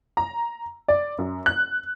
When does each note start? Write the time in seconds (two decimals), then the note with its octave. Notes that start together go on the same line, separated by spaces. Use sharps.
0.17 A#5
0.88 D5
1.19 F#2
1.46 F#6